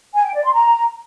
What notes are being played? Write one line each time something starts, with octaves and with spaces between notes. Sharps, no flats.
G#5
G5
D5
C6
A#5